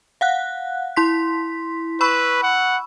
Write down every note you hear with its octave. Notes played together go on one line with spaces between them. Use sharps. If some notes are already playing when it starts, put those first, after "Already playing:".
F5 F#5 F#6
E4 C6 B6
B4 B5 C#6 E6
F#5